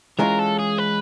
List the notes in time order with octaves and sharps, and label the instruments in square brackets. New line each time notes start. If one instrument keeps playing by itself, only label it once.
[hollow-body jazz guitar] E3 G#3 C#4 F4 [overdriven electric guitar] A#4
[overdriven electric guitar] A4
G#4
B4